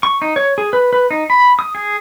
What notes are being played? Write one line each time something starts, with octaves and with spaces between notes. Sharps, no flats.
C#6
D#4
C#5
G#4
B4
B4
D#4
B5
D#6
G#4